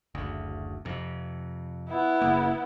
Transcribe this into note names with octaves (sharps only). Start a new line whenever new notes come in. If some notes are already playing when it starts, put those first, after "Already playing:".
F#1 D2
F2 C3
B3 E4
F#1 C#3 A#3